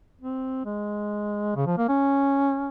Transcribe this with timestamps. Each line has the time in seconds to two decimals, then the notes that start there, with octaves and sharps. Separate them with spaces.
0.21 C4
0.66 G#3
1.56 C#3
1.66 F3
1.78 A#3
1.89 C#4